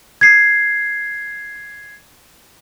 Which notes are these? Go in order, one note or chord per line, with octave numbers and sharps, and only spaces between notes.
G#6 C7